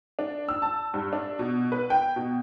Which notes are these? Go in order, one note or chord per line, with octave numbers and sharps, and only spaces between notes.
D4
E6
A5
G2
D4
B2
B4
G5
B2